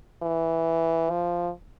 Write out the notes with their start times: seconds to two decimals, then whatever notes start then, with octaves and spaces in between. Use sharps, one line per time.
0.22 E3
1.10 F3